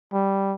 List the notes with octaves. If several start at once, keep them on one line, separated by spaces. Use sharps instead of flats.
G3